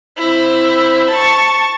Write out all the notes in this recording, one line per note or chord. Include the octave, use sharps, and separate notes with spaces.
C4 E4
A5 C#6